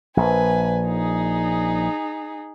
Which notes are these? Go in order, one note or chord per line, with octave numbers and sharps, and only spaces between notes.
A#1 B4 G#5
D#4 G#4